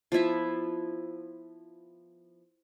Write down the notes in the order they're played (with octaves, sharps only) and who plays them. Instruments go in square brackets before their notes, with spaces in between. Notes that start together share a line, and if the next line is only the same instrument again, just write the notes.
[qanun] F3 B3 E4 E5